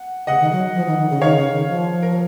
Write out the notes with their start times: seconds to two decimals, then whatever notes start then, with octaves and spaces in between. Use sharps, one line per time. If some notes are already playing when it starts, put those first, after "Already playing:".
Already playing: F#5
0.27 C#3 D#5 F#5
0.40 D#3
0.52 F#3
0.74 F3
0.86 D#3
0.98 D#3
1.10 C#3
1.21 D#3 C#5 F5
1.37 C#3
1.53 D#3
1.68 F3
2.03 A#4